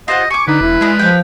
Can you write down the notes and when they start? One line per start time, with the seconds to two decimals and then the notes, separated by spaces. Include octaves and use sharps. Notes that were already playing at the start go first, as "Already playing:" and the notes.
0.08 F4 C5 D#5 F#5
0.31 G#5 C#6 D6
0.47 D3 D#4 B4
0.61 E1 E4
0.81 G#3 D4 A#4
0.99 F3 F5 G5